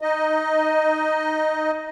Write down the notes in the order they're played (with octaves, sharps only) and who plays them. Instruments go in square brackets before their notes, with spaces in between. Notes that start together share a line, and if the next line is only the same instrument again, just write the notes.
[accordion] D#4 D#5